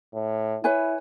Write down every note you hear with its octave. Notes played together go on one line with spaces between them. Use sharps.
A2
E4 B4 C#5 G#5